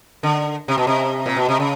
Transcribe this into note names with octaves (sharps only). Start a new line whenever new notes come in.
D3
C3
B2
C3
A#2
B2
C3
C#3